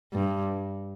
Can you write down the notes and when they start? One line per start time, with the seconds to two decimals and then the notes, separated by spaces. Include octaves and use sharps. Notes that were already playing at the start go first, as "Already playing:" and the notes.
0.13 G2